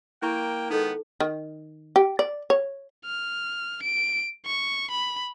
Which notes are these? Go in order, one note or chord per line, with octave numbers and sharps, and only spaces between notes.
A#3 E4 G5 A#5 C#6
D#3 G#3 B3 D#4 A4
D#3
G4
D5
C#5
F6
D7
C#6
B5